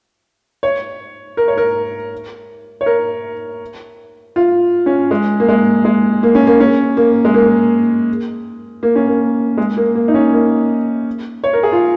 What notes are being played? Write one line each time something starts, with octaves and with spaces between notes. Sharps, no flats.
C#5
A#4
C#5
A#4
C#5
A#4
F4
C#4
G#3
A#3
G#3
G#3
A#3
C#4
A#3
C#4
A#3
G#3
A#3
A#3
C#4
A#3
G#3
A#3
A#3
D#4
C#4
A#3
C#5
A#4
G#4
F4